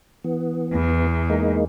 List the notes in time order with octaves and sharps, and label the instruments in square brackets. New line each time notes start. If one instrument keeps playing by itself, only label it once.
[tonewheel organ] E3 B3
[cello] E2
[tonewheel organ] G#3 A#3 D#4